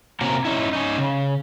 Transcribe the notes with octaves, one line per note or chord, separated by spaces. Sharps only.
C3 A#3 C#4 F#4 A#4
C#4 D#4 E4
C#4 D#4
C#3